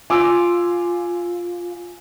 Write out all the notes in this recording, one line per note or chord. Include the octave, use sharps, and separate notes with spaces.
F4 G#5 D6 E6